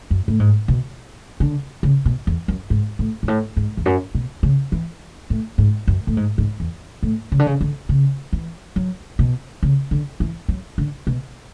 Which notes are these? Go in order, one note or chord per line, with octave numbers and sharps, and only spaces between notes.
F#2
A2
G#2
B2
D3
C#3
B2
E2
F#2
G#2
A2
G#2
A2
G#2
E2
F#2
B2
C#3
E3
A2
G#2
F#2
A2
G#2
G#2
E2
A2
C#3
D3
C#3
D3
C#3
E3
F#3
B2
C#3
D3
E3
F#3
D3
B2